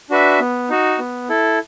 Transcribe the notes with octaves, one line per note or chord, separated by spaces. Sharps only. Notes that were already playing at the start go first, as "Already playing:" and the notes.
D4 F#4 B4 E5
B3
D#4 F#4
B3
E4 A4